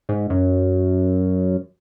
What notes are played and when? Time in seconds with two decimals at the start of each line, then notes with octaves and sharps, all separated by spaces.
0.09 G#2
0.30 F#2